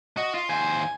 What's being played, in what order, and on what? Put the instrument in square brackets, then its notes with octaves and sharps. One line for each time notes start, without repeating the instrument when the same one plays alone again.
[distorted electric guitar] F#4 [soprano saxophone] D#5
[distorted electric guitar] F4
[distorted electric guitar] D#2 C5 [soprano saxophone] G#5